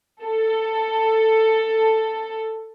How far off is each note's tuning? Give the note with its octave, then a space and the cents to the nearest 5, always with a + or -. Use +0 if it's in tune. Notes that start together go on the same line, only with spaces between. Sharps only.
A4 +10